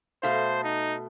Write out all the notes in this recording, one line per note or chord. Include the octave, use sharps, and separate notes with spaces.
B2 A3 C5 F5
D#4